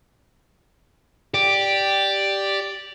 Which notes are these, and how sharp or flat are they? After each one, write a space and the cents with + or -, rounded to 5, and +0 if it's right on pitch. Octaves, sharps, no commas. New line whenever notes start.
G4 +0 D5 +0